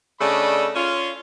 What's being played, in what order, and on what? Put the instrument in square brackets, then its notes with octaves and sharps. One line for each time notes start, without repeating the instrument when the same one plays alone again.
[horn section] C#3 A3 D4 D#5 B5
C#4 F4